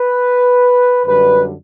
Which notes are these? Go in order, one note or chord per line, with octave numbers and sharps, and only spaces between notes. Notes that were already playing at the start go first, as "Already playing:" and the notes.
Already playing: B4
F#2 D3 G3 B4